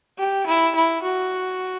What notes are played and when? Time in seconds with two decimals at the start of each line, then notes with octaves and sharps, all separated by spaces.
0.19 G4
0.47 E4
0.76 E4
1.03 F#4